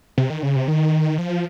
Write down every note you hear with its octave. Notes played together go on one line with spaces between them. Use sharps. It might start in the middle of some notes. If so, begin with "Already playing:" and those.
C3
D#3
C#3
C3
D#3
F3